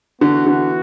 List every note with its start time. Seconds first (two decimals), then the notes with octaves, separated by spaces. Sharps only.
0.21 D3 E3 B3 F#4
0.47 D3